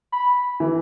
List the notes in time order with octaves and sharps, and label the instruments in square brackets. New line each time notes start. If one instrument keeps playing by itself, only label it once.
[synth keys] B5
[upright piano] E3